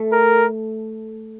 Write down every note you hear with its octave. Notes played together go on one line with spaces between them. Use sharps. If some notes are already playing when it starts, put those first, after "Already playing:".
Already playing: A3
A#4